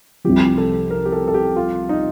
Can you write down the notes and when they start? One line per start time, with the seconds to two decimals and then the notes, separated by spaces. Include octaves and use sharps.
0.24 C2 C3 F3 G4
0.58 A4
0.90 A#4
1.05 G4
1.12 A4
1.28 A4
1.34 G4
1.56 F4
1.89 D#4